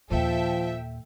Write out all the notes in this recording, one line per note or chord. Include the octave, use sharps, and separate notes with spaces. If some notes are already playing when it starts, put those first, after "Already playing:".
D#2 A#2 F3 A4 E5 G5